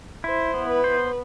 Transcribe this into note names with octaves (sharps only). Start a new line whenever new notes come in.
E4 C5
B3
B4
C5